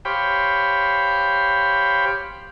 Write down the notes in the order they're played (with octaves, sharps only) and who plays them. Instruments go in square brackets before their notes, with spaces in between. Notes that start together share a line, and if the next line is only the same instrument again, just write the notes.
[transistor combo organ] G4 C5 C#5 F5 G5 B5